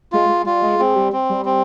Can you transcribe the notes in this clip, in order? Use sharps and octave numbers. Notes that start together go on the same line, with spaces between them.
G#3 F4
G#3
G3 F4
G#3
G#3 C4
G3
C4
G3
C4